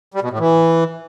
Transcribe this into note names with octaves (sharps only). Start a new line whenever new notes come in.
G3
B2
A2
E3